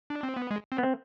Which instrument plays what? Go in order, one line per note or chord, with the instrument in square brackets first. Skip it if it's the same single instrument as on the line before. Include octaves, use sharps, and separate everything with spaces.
[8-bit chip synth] D4
C4
B3
G#3
C4
[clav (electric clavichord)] B3
C4